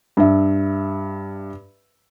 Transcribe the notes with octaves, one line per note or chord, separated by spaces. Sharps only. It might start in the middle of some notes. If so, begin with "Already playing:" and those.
G2 E5